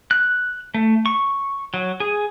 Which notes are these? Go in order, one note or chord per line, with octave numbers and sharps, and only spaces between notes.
F#6
A3
C#6
F#3
G#4